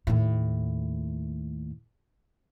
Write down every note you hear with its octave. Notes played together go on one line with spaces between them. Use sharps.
D#2 A2